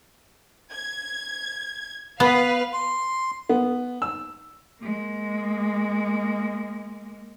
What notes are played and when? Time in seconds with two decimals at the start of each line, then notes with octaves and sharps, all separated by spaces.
0.73 G#6
2.20 B3 B4 F5
2.73 C6
3.49 B3
4.02 E6
4.80 G#3 A#3